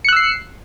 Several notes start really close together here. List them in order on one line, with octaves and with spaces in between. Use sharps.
C#7 F#6 E6 C7